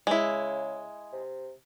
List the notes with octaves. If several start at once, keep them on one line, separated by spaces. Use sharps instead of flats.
C#3 G#3 E4
C3